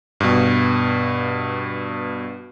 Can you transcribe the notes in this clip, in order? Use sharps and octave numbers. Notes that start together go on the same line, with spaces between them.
G2 B2